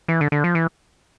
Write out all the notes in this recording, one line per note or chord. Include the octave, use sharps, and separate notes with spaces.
E3
D3
D3
F3
E3